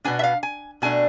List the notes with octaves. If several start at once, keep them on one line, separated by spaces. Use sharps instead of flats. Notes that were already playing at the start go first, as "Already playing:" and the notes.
B2 B3 D4 G#5
E5
F5
G#5
B2 A3 D4 G#5